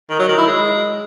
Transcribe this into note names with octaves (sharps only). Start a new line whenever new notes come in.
D#3
F#3
D#3
E4
G#3